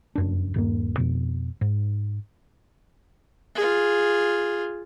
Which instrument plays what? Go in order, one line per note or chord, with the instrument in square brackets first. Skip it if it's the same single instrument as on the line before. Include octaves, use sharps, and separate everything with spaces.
[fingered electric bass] F1 F#2 D4
D#1 G2 A#3
F2 B2
G#2
[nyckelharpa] F4 G#4